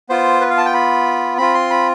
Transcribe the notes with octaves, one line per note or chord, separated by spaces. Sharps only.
B3 F4 C5
B4
F5
A5
G5
B5
C4 F4 B5
C6
B5